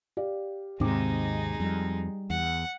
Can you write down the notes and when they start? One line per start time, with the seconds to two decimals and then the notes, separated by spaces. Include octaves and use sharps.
0.17 G4 D5 F5
0.80 G#1 D#2 G#2 C3 G#3 C4 D#4 D6
1.60 F2 G3
2.30 E2 F#5